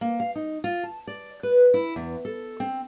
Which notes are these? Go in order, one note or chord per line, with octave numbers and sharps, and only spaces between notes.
A#3
F5
D#4
F4
A5
D5
B4
E4
E2
A4
C4